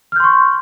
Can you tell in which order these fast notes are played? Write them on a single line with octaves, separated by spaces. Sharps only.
F6 G6 C6 C#6